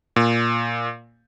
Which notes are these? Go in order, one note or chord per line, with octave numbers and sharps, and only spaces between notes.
A#2